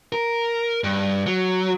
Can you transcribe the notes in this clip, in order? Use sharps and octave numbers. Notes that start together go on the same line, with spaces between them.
A#4
G2
F#3